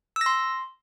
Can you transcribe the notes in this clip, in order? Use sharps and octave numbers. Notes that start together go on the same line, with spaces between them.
E6
A#6
C6